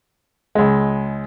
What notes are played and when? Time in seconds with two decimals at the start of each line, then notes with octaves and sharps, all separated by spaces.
0.55 C#2 G#3